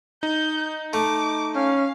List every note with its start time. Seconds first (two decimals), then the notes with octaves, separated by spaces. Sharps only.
0.23 D#4 G6
0.93 A3 D6
1.55 C#4 F5